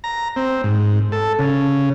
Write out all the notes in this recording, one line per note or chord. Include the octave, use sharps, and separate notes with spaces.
A#5
C4
G#2
A4
C#3